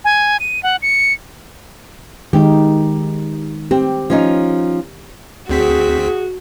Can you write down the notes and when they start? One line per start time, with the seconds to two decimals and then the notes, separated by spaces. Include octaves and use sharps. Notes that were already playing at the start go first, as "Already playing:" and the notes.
0.05 G#5
0.40 D#7
0.63 F#5
0.82 C#7
2.33 D#3 G#3 D#4 G4
3.71 C4 G4
4.10 F3 C#4 D#4
5.49 D2 C4 F#4 G#4 B6